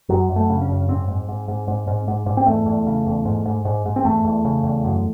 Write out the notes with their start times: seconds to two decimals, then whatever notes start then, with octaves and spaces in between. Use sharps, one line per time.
0.09 F#2 F#3
0.29 F#2
0.36 A3
0.50 C#3
0.62 C#4
0.68 F#2
0.89 G#2 C4
1.08 G#2
1.29 G#2
1.48 G#2
1.68 G#2
1.87 G#2
2.08 G#2
2.26 G#2
2.37 C4
2.47 E2 A3
2.66 E2
2.87 C#3
3.06 E2
3.25 G#2
3.45 G#2
3.65 G#2
3.86 G#2
3.96 C4
4.04 E2 A3
4.24 E2
4.45 C#3
4.64 E2
4.84 F#2